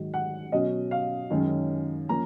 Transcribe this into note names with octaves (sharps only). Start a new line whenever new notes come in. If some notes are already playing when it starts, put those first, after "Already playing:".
Already playing: G#2 D#3 F#3
F#5
B2 F#3 C#4 D#5
F5
F#2 D#3 G#3 C#4
F3 A#3 C#4 A#5